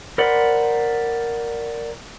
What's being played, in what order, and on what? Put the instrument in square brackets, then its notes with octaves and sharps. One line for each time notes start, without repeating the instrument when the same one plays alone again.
[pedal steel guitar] A#4 C5 D5 F#5 B5